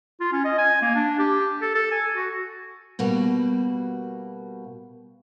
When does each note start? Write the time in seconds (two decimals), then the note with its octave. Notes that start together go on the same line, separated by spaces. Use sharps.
0.20 F4
0.32 C#4
0.44 D#5
0.58 G#5
0.82 A#3
0.95 D4
1.19 G4
1.62 A4
1.75 A4
1.91 G#5
2.15 F#4
2.99 B2 G3 A#3 F#4